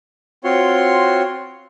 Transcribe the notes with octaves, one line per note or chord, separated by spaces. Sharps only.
C4 F4 F#4 C#5 C6